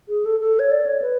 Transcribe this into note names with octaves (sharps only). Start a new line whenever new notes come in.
G#4
A4
A4
C#5
D5
C#5
B4